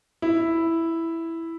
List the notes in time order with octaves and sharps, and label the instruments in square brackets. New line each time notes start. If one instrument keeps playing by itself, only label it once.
[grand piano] E4